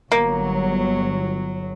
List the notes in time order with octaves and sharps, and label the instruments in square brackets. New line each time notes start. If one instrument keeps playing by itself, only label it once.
[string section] G1 F#3 [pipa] A#3